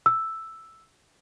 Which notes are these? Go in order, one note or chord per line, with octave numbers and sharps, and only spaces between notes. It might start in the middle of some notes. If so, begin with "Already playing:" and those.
E6